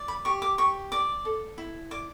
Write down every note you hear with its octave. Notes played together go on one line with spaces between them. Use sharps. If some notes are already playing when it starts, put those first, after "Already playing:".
Already playing: D5
B5
G4 C#6
D6
G4 C#6
D5 D6
A4
E4
D5 D6